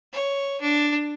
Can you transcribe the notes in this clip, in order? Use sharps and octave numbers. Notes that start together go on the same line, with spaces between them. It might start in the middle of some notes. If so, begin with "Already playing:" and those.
C#5
D4